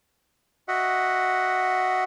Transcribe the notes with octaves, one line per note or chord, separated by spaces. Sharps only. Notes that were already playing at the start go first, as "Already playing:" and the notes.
F#4 D#5 E5 F#5